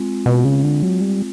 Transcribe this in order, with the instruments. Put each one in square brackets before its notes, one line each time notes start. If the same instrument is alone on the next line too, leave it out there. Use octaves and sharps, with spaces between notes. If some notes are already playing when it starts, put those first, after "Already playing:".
Already playing: [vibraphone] G#3 C4 F4
[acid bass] B2
C#3
D3
F#3
G3